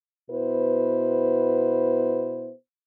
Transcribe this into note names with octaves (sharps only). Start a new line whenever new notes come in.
B2 B3 E4 B4 C5